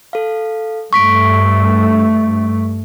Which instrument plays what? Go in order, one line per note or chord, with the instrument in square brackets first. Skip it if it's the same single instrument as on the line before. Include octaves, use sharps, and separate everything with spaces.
[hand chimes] A4 F5
[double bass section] G2 A3 [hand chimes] C#6 B6 D7